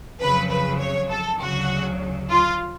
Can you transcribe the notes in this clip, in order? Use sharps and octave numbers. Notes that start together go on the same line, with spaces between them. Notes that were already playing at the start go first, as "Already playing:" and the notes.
F2 C#3 F#3 B4
B4
C#5
A4
D2 C#3 F#3 F#4
F4